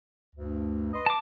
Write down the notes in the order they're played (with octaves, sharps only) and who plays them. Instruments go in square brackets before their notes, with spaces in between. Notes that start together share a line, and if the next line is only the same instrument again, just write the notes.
[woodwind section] D2 G2
B4 D#5 C6
[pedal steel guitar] A5 D6